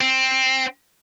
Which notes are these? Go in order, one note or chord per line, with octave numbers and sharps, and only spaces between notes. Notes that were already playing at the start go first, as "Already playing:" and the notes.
C4